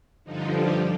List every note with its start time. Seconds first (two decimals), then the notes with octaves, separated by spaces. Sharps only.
0.24 G2 D3 F3 D#4
0.52 G4